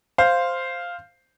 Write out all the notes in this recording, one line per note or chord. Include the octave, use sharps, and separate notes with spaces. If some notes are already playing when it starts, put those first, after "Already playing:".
C5 F5